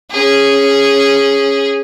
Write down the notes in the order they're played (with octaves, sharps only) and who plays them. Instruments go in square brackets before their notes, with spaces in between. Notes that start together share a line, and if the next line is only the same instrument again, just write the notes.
[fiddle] C#4 G#4